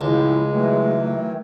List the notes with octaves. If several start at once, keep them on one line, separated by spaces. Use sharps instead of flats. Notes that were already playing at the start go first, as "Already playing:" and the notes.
C#2 A2 F3 F#3 G#3 E4
D#3 E3 F#3 A3